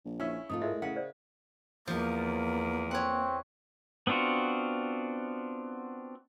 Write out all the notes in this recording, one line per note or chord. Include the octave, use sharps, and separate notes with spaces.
A#1
C#4 E4 G#4 F5 C#6
F1 G#2 A3 F4 D#6
A2 G#3 A#4 D#5 E5
C#3 E4 F5 F#5
C5 D5
E2 F3 A#3
C4 C#5 F#5
B3 C4 D4 F4 F#4